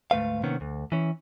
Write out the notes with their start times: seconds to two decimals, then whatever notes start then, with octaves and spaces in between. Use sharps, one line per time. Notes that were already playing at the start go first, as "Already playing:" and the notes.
0.11 D2 G#2 A3 B4 F5
0.43 C3 D#3 A#3 B3 C#4
0.61 D2
0.92 E3 C#4